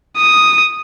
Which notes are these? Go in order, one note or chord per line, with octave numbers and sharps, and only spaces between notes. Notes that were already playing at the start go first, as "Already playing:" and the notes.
D#6